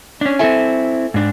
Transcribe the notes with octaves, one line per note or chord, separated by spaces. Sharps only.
C#4 D4
C4 E4 A4 E5 G#5
G#2 D4